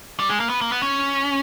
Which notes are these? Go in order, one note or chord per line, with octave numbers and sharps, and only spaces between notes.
G3
G#3
A#3
B3
A#3
B3
C#4